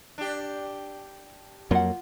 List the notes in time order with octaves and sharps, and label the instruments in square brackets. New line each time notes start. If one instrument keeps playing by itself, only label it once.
[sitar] D4 G4
[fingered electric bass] F2 F#3 A#3 [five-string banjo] F4 F#5